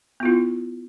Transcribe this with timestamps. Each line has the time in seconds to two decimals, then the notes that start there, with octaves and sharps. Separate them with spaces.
0.20 B3
0.23 F4
0.25 E4